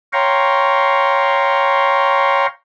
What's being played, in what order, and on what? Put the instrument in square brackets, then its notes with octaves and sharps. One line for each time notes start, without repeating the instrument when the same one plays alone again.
[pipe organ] C#5 F5 G5 A#5 C6 C#6